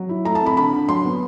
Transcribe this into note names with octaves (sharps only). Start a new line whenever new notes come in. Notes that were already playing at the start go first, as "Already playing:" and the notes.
Already playing: F#3
E4
A3 A#5
A5
C4
B5
D3 B5
D3
F#3 C6
B3